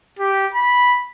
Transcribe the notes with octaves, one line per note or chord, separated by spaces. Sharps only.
G4
B5